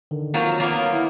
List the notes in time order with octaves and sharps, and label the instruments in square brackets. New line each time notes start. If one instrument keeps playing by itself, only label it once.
[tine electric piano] D3 D#3
[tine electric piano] D#3 A#3 [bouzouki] F3 F#3
[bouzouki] A#3 B3 [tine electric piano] C#5
[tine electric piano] E4